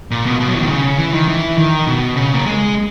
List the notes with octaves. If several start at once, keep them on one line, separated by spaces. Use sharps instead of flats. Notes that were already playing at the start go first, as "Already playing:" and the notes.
A#2
B2
B2
F#3
E3
D#3
C#3
E3
D#3
E3
D#3
B2
C#3
A#3
G#3